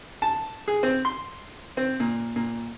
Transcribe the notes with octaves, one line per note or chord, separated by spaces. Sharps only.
A5
G#4
C4
C6
C4
A#2
A#2